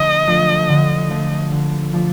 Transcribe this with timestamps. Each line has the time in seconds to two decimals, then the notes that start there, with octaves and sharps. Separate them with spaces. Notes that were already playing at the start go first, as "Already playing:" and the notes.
Already playing: D3 F3 A3 D4 D#5
0.27 F3 A3 D4
0.69 D3
1.10 F3 A3 D4
1.52 D3
1.93 F3 A3 D4